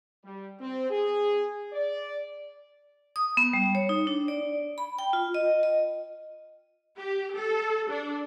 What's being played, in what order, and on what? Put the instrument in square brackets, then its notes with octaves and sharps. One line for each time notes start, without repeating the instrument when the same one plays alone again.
[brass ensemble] G3
C4
G#4
D5
[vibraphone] D#6
B3
G3
C#5
D#4
D4
D5
B5
G5
F4
D#5
D#5
[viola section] G4
A4
D4